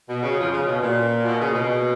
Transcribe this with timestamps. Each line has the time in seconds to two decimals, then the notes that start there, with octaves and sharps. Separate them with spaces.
0.08 B2
0.23 C#3
0.37 F2 F3
0.51 C#3
0.67 B2
0.82 A#2
1.25 B2
1.40 C#3
1.51 A#2
1.54 B2